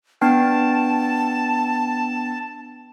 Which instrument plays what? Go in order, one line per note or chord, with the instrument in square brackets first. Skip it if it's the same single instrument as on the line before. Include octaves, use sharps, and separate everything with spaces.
[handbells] B3 D4 G5 [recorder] A5